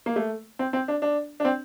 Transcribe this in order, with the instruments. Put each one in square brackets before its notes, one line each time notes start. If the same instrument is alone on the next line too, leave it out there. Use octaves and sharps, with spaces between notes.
[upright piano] A#3
A3
C4
C4
D4
D4
D4
C4